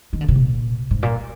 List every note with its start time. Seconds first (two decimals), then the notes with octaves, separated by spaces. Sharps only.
0.13 D#3
0.21 D3
0.28 C3
0.36 A#2
0.91 G#2
1.03 A#2